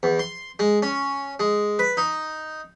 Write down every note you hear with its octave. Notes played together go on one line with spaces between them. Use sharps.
E2
C6
G#3
C#4
G#3
B4
D#4